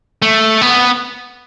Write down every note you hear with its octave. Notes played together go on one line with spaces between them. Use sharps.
A3
B3